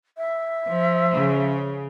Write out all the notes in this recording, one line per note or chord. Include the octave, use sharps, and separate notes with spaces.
E5
F3
C#3